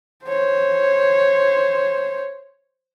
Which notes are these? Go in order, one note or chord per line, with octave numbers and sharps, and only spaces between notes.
C5 C#5